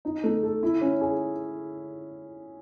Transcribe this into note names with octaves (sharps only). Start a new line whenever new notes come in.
D#4
A3
A4
E4
C#4
G#4